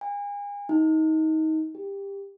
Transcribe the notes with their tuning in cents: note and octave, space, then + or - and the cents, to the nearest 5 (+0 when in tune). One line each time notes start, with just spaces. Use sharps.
G#5 -35
D#4 +25
G4 +20